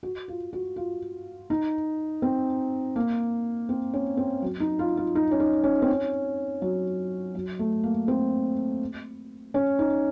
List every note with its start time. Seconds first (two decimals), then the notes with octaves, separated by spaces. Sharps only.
0.03 F#4
0.28 F4
0.53 F#4
0.76 F4
1.50 D#4
2.22 C4
2.96 A#3
3.69 C4
3.93 C#4
4.17 C4
4.42 F#3
4.60 D#4
4.79 F4
4.97 F4
5.15 D#4
5.31 C#4
5.40 D#4
5.63 C#4
5.82 C4
5.88 C#4
6.62 F#3
7.35 F#3
7.59 A3
7.83 A#3
8.08 C4
9.54 C#4
9.79 D#4